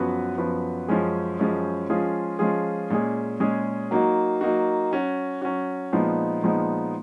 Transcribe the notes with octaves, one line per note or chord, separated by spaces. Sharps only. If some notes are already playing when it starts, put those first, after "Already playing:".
Already playing: F#2 F3 B3 F#4 B4
F#2 F3 B3 F#4 B4
F#2 F3 G#3 C#4 G#4
F#2 F3 G#3 C#4 G#4
F3 G#3 C#4 F4 G#4
F3 G#3 C#4 F4 G#4
A#2 G#3 C#4 G#4
A#2 G#3 C#4 G#4
F#3 A#3 D#4 F#4
F#3 A#3 D#4 F#4
F#3 C#4 F#4
F#3 C#4 F#4
A#2 F3 G#3 B3 D#4
A#2 F3 G#3 B3 D#4